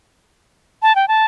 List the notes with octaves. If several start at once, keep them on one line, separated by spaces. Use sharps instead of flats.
A5
G5
A5